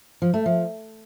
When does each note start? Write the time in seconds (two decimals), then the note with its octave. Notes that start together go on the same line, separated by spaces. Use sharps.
0.22 F3
0.34 A3
0.46 F3